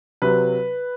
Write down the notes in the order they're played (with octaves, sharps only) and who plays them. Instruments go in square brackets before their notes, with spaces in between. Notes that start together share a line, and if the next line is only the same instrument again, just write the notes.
[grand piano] C3 F#3 B4